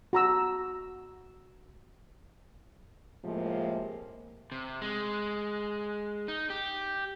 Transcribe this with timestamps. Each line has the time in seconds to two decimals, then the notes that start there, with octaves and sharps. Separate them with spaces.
0.13 F#4 A#5 E6
3.24 A2 C3 F3 G#3 A#3
4.52 C3
4.82 G#3
6.28 D#4
6.50 G4